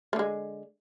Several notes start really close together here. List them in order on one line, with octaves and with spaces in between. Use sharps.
A3 D3 G#3